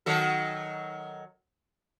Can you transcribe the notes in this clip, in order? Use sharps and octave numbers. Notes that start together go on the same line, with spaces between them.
D#3 F#3 A4